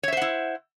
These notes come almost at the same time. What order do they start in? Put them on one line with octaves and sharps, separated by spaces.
C#5 E5 C5 F#5 E4